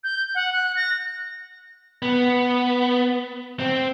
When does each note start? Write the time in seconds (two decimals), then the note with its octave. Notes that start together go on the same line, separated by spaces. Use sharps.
0.04 G6
0.35 F#5
0.53 F#6
0.76 A#6
2.02 B3
3.60 C4